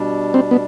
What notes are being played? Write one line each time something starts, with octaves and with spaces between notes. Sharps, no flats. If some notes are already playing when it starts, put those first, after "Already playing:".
Already playing: B2 G3 D4
C4
B3